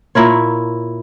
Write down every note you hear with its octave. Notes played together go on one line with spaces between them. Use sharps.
A#2 E4 A#4 C#5